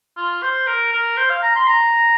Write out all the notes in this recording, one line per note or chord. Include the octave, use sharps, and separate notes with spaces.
F4
C5
A#4
A#4
C5
F5
A#5
C6
A#5